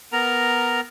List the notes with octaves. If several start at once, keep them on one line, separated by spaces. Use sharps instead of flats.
B3 A#4 A#5